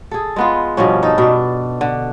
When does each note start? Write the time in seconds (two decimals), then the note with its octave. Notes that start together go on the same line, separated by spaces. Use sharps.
0.11 G#4 A4
0.36 G#3 B3 F4
0.77 G2 B2 F3 C#4
1.02 D#4 A4
1.18 B2 D4
1.81 D3